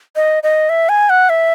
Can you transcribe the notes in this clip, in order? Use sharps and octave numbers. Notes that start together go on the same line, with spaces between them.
D#5
D#5
E5
G#5
F#5
E5